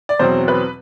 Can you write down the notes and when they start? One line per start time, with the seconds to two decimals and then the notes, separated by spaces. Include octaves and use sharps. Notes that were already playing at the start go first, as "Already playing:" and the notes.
0.09 D5
0.19 E2 B2 F#3 C4 C5
0.48 B4